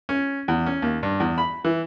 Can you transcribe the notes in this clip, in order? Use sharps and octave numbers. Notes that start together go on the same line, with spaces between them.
C#4
E2
C#4
D#2
G2
E2
B5
E3